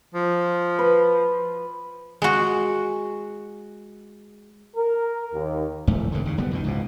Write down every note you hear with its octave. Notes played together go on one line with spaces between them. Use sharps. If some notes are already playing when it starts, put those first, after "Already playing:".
F3
B4
G#3 F#4
A#4
D#2
D#1 A1 F2 A3
E1 G2 D3
D#2 C#3
F#1 G3 B3
F2 B2 D#3
C#2 G#2 B2